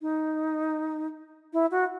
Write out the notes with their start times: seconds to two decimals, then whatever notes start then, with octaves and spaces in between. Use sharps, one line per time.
0.02 D#4
1.53 E4
1.71 F#4